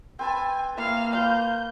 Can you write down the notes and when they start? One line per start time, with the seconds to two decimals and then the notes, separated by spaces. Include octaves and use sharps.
0.19 C4 B4 G#5 A5
0.77 A#3 E4 F5
1.13 F4 B4 F5 G6